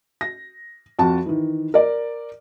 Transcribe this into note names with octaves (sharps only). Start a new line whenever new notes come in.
A#6
F2 F#4 A5
D#3 E3
A#4 D5